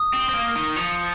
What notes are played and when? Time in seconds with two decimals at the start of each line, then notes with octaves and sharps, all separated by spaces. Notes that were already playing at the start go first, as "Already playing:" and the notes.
Already playing: D#6
0.14 C4
0.20 G7
0.29 C4
0.34 A#3
0.48 A#6
0.56 D#3
0.76 F3 C#7